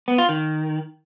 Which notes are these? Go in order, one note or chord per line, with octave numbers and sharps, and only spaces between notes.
B3
F4
D#3